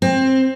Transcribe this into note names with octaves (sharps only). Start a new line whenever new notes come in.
C4